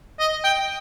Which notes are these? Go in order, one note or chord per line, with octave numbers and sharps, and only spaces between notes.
D#5
G5